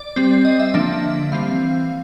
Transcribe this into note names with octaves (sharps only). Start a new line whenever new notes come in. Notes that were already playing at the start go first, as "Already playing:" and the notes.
Already playing: D5
G3 C4
D#5
E5
D3 F3 A#3 D4 E5
E3 G3 C4 F5